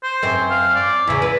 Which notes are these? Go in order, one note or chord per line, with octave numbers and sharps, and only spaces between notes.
C5
F#2 C4
F5
D5
E2 C#3 E4
B4